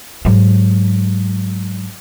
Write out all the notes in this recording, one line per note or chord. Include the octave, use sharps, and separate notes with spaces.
G#2 F#3